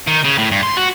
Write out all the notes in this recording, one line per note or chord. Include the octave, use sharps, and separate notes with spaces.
D#3
C#3
A2
G2
C6
F#4